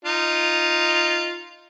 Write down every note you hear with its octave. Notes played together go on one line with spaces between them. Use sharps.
D#4 F4